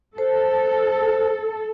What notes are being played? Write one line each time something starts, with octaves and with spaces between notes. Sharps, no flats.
A4 C5